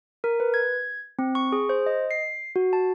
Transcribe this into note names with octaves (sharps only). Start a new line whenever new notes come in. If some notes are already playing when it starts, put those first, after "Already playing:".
A#4
B4
G#6
C4
C#6
G#4
C5
D#5
C7
F#4
A5